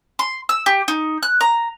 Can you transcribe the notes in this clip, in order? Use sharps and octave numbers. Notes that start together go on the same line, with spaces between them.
C6
E6
G4
D#4
F#6
A#5